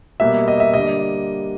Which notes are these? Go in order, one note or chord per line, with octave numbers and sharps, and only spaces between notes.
B2 G3 A#3 E5
D#5
E5
D3 G3 A#3 D#5